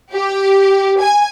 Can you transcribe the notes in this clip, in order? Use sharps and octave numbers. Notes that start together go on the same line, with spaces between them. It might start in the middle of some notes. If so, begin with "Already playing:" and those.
G4
G#5